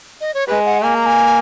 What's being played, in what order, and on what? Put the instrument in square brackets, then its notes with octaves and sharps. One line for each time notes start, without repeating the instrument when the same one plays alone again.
[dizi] D#5
C#5
[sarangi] G#3 [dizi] B4
[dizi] F#5
[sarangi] A#3 [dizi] G#5
[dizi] A#5
G#5